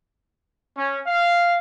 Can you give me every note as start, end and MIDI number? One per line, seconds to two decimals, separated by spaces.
0.76 0.99 61
1.05 1.57 77